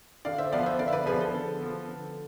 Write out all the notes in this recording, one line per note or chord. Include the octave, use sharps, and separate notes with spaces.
D3 D5 F5
C5 E5
F3 B3 D5 F5
C5 E5
D3 D5 F5
E5
B4 D5
F3 B3 G#4 B4
A4
D3
F3 B3
D3